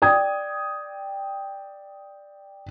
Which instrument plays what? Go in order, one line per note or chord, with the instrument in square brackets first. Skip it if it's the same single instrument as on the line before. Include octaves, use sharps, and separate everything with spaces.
[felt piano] D5 G5 D#6 G#6